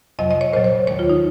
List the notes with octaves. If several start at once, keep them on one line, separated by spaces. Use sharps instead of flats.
F2 C3 F#3 D#5
D#5
C#5
A#2 F#3 C5
C#5
D#2 D#3 G#3 C#5
F4
D#4